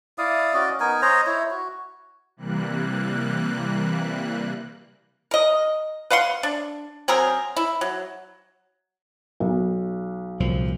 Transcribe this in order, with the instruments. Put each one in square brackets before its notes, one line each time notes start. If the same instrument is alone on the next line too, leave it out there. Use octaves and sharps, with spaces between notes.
[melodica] E4 D5 F5 D#6
C#4 F#4 D5 D#5
B3 D#4 A#4 G#5
C5 C#5 D#5 A#5
E4 C#5
F#4
[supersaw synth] C3 E3 G3 A#3 F#6
[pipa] A#4 D#5
B4 F5 F#5 C6
D4
F#3 C4 G#4 A#4
E4
F#3
[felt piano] B1
[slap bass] C2 A#2 F3